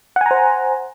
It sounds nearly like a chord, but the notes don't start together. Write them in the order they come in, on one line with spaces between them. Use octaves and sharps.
F#5 G#5 A#5 C5